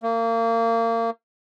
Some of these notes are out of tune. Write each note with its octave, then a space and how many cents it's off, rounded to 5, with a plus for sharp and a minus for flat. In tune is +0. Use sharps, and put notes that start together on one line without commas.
A#3 -30